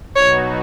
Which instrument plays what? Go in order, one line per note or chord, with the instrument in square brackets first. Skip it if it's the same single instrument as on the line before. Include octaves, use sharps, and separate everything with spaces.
[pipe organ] B2 F#3 B3 D#4 F#4 [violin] C#5